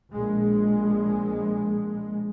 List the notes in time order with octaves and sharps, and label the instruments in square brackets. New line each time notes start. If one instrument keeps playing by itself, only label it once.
[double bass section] A#1 G#3